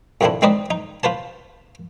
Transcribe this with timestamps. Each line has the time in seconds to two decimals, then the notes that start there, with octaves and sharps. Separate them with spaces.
0.21 F2 C3 D#3 F3 D4 E4
0.42 G#3 C4 D#4 B4 D5 D#5
0.71 D#4
1.03 F4 B4 C5 A5